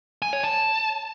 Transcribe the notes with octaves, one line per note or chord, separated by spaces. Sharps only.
G#5
C#5
A5